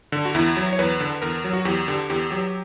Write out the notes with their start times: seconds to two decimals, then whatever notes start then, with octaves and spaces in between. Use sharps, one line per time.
0.12 D3
0.25 F#4
0.35 E2 E4
0.57 F#3
0.73 C#5
0.79 E2 B4
1.00 D3
1.22 E2 A#4
1.44 F#3
1.53 F#4
1.65 E2 G4
1.88 D3 G4
2.10 E2 G4
2.31 F#3 G4